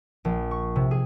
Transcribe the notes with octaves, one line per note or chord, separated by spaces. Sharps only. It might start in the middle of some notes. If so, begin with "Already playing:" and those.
A#1
C#6
C3
G#4